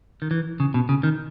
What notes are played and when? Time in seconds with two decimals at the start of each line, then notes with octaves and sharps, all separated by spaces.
0.22 D#3
0.31 E3
0.60 C#3
0.74 B2
0.89 C#3
1.03 D#3